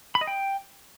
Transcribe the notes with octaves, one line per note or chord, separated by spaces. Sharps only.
B5
D#5
G5